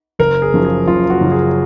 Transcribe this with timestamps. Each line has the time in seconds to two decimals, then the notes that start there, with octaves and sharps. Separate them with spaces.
0.19 F#1 A#4
0.42 G#4
0.54 F#2 C#3 F3
0.65 G#4
0.87 F#1 F4
1.10 F#4
1.21 F#2 C#3 F3
1.32 G#4